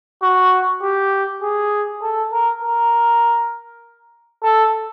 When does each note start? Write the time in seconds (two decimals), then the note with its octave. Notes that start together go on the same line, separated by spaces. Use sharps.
0.22 F#4
0.83 G4
1.42 G#4
2.02 A4
2.32 A#4
2.63 A#4
4.43 A4